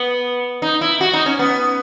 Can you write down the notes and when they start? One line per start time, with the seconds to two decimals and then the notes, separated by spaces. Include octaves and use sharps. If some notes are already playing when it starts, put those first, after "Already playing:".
Already playing: B3
0.62 D#4
0.81 E4
1.01 F#4
1.13 D#4
1.26 C#4
1.39 B3